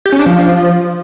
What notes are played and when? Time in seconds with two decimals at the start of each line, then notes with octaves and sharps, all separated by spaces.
0.06 G4
0.12 C#4
0.19 D4
0.26 F3